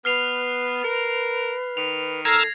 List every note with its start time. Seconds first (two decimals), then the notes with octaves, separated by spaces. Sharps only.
0.05 B3 B4 F6 C7 F7
0.84 A#4
1.77 D#3 F7
2.25 A4 A#5 E6 F6 G#6 A#6 C7